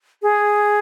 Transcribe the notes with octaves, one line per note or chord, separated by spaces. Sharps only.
G#4